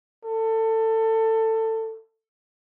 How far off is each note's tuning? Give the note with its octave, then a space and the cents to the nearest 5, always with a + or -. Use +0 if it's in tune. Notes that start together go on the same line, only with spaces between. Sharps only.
A4 +20